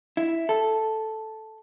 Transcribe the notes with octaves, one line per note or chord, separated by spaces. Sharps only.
E4
A4